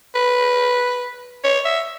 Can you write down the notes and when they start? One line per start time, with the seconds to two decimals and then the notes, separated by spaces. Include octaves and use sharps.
0.15 B4
1.44 C#5
1.65 E5